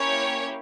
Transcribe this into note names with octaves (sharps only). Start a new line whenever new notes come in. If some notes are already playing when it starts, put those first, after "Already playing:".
Already playing: A#3 C#4 E4 G4 C#5